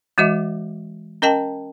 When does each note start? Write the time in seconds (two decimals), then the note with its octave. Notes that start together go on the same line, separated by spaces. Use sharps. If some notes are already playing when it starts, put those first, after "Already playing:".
0.18 E3 G#3 F#4 D#5 E5
1.22 C#4 A#4 D#5 G5 A5